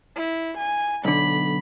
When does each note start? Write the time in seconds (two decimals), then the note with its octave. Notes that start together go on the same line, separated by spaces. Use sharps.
0.16 E4
0.58 G#5
1.05 B1 D3 B5